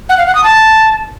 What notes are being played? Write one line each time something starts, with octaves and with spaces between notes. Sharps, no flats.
F#5
F5
F#5
D#6
A5